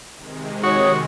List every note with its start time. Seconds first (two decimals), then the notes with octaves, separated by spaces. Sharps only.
0.15 C3 D#3 G#3
0.63 F#4 C#5 D#6